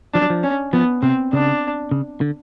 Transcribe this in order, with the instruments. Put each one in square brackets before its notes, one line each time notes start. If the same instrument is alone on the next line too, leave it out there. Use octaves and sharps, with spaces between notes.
[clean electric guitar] F3 [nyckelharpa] D4
[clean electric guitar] F#3
F3
[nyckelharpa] C#4
[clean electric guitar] F3 [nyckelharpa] B3
[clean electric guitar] C3 [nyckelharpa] C4
[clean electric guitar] C#3 [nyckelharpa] D4
[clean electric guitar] C#3
D3